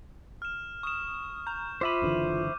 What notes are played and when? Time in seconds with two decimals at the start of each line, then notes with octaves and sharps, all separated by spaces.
0.42 F6 E7
0.83 C#6 D#6 E7
1.47 A#5 G6
1.81 F4 C5 E5 B5 D6 D#7
2.02 F#1 D3 E3